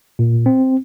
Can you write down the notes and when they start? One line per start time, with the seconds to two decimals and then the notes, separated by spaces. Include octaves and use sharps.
0.19 A#2
0.46 C4